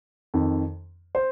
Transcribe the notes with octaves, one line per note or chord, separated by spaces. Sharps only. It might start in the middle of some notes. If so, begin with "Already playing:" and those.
F2 D#3
C5